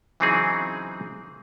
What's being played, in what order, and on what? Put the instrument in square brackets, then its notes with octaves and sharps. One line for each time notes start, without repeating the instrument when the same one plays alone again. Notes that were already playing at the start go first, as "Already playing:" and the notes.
[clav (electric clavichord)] C#3 E3 F#3 C4 D#4 G#4